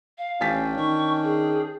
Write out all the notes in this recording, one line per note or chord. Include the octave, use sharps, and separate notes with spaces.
F5
A1 C#4 D4 G5 G#5 A6 B6
D#3 C#6
G#4